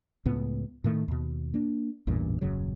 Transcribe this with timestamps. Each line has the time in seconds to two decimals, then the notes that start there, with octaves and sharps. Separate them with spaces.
0.26 C#2 A2 B3
0.84 A2 D#3 A3
1.08 D#2 B2
1.54 A#3 D4
2.07 A1 E2 G2 A#2
2.41 D#1 F#2 C#3 F#3